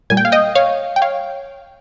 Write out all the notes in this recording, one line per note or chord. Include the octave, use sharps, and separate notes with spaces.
A#2 G3 G#5
G5
F5
D#5 G5
C#5 F5
G5
C#5 F5